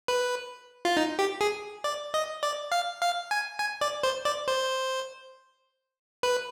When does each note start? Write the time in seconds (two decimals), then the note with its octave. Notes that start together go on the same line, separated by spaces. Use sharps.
0.08 B4
0.85 F4
0.97 D#4
1.19 G4
1.41 G#4
1.84 D5
2.14 D#5
2.43 D5
2.72 F5
3.02 F5
3.31 G#5
3.59 G#5
3.81 D5
4.03 C5
4.25 D5
4.48 C5
6.23 B4